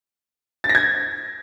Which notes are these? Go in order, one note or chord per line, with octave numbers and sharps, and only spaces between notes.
A6
A#6
G#6